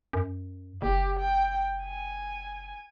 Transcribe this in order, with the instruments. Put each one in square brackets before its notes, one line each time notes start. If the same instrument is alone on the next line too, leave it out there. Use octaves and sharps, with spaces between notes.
[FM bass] F#2
[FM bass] F#1 [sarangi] G4
[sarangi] G5
G#5